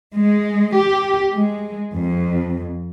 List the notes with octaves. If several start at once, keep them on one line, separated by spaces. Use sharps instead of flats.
G#3
G4
G#3
F2